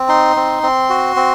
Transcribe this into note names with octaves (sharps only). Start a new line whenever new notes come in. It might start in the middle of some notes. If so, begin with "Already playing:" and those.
Already playing: C4
D#4 C6
C4
C4
F#4
C4